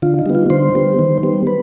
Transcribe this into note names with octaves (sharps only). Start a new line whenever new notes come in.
D3 F4
D#4
G3 B3
F4
D3 C5
G3 B3
D#3
G3 B3
B4